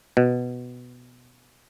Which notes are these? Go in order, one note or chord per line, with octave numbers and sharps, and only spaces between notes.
B2